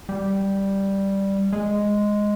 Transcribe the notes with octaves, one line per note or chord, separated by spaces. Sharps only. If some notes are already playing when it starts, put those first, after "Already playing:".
G3
G#3